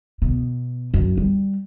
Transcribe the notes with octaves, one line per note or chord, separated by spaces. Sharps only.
B2
F#2
G3